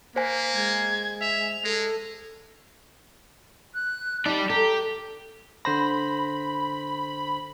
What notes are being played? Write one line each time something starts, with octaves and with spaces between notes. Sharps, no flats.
A#3 C5 G#5 B6
G#3 G#6
E5 F7
G#3 A4
F#6
G3 D#4 G4 D5 A5
G4 A4 A#5
D3 C5 B5 A#6